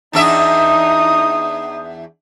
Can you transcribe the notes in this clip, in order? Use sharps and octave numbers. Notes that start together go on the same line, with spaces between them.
E2 D4 D#4 E5 D#6